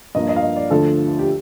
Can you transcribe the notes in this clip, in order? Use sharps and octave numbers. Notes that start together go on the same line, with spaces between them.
G2 F3 A#3 D#5
D#5
F5
D#5
D5
D2 D3 F3 A4
G4